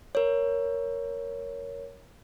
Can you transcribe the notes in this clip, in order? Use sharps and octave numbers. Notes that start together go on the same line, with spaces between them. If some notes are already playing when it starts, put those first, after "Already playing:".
A#4 C#5